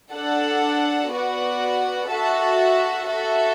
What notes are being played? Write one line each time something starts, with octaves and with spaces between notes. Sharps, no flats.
D4 A4 F#5 A5
B3 F#4 D5 F#5
F#4 A4 E5 A5
F#4 A4 E5